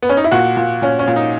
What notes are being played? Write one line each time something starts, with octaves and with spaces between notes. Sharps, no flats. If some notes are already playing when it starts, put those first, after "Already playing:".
B3
C#4
D#4
E4
A#2 F#4
A#2
A#2 C#4
C#4
A#2
D#4